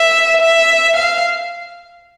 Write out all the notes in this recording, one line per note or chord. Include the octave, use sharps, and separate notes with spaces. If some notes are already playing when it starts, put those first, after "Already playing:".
Already playing: E5
E5
F5